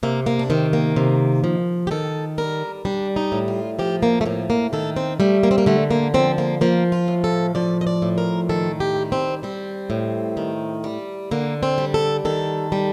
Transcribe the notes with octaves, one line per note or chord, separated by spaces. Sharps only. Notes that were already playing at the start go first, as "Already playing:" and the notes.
C3 A#3
A#3
D4
D#3 C4
A#3
C3
F3
G4
D#3 A4
G3 A#4
G3 D4
D#4
A2
F4
F3 G4
A#3
A3
A2 A#3
A#3
D#3 A4
C4
G3 A3
A#3
C4
A#3
D3 A3
A#3
F3 C4
A#3
F3 A#3
F4
A2
A4
F3 D5
D#5
D5
A2
A#4
D#3 A4
G4
G3
C4
G3 C4
A2
D#3
G3
D3 A#3
C4
G3
A4
D#3 A4
G3